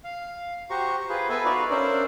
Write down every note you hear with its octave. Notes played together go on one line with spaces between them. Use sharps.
F5
F#4 G4 C5 A#5 C#6
F4 G#4 B4 C5
B3 A4 B4 E5 G#5
D#4 F4 F#4 B4 D5
C#4 D4 A#4 C5 D5 E5